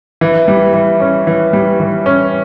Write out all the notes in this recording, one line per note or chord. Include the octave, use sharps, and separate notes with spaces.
E3
G3
E3
C#4
E3
G3
E3
C#4